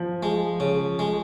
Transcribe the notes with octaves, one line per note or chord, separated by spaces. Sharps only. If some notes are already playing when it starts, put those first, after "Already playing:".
Already playing: F3
G#3
C#3
G#3